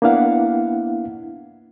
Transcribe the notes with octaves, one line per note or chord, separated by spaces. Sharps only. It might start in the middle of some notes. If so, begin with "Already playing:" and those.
A#3 B3 D4 E4 F5 F#5